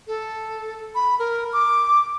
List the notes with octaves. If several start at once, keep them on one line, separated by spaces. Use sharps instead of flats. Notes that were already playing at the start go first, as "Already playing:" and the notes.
A4
B5
A#4
D6